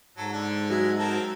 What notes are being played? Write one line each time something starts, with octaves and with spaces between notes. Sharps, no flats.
G#2 F#3 A4
D3 D4
F#3 G#3 E5
C4 A4 A#4